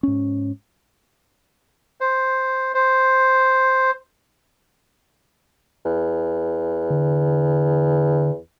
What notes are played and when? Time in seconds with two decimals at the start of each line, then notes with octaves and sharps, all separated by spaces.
0.03 G#2 C#4
2.01 C5
2.75 C5
5.85 E2
6.90 D3